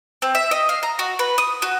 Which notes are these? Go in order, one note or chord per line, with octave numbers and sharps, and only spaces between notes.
C4
E5
D#5
F5
A#5
F#4
B4
D#6
F#4